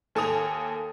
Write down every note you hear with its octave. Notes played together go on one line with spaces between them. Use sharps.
D#2 A4 G#5 D#6 F7